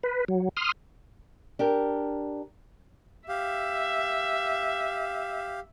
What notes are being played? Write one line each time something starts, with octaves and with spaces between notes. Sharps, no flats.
B4
F#3
C6 D#6 F6
D4 G4 A#4
G4 E5 F5